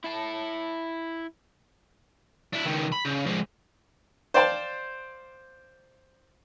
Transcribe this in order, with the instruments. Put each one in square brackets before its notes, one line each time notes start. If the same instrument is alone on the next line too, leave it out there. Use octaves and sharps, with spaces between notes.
[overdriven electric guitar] E4 A5
[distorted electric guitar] D4 E4
C#2 D#3
B5
C#3
F3 G#3
[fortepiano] C5 D5 F5 G5 A5 C6